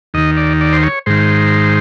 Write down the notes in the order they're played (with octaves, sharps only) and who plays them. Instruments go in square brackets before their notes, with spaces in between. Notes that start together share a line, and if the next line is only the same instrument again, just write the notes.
[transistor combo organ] D#2 D#3 D#5
D5
D5
C5
C#5
G#2 D#3 C5